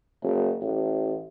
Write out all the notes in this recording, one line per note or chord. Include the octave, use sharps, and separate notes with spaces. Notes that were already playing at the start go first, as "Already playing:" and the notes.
F#1
A1